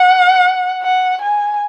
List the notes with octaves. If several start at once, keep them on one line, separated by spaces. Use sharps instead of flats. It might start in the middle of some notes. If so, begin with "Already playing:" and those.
Already playing: F#5
F#5
G#5